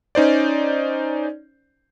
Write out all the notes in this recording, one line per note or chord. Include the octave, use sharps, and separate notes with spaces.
C#4 D#4 C5 D5